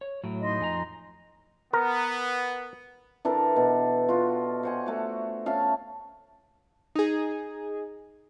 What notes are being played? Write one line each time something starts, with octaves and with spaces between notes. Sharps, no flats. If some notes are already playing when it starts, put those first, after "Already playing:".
C#5
A2 F#3 A3
D#4 D#5 C6
F2 G#5 A#5
B3 A#4
E3 D4 A4 A#4
B2
F4 F#4
C5 F#5 G#5
A3 F#4
C#4 E5 F5 A5
D#4 G#4